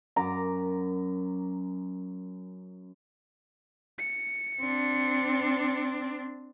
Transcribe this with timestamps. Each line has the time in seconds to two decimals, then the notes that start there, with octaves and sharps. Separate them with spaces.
0.16 F#2 A#5 D6
3.99 C#7
4.61 C4 D4